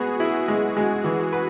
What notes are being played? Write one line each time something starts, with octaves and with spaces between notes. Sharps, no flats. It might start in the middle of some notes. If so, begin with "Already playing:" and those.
Already playing: G#3 B3 F#4 G#4
E4 G#4
G#3
G#3
E3
B4